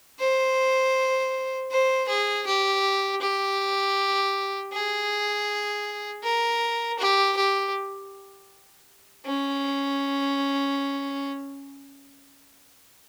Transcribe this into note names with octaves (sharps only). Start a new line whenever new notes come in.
C5
C5
G#4
G4
G4
G#4
A#4
G4
G4
C#4